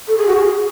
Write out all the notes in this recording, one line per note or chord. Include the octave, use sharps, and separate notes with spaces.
A4
G#4
F#4
G#4